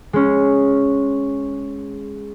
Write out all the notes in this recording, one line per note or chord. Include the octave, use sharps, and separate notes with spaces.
G#3 C#4